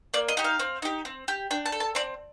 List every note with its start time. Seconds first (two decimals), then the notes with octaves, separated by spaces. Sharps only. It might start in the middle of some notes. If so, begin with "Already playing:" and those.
0.14 A#3 D5
0.28 D#5
0.37 D#4 G4
0.44 F5
0.59 C4
0.82 D#4 G4
1.05 C4
1.28 G4
1.51 D4 G5
1.66 A5
1.72 A4
1.80 A5
1.95 C4 D5